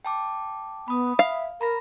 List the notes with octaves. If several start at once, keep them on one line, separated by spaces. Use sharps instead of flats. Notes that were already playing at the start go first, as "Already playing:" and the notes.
G5 A5 D6
B3 B5 D#6
E5 F5
A#4 A#5 B5 A#6